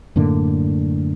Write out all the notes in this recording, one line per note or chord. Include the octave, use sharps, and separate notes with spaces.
F#2 A2 D3 A#3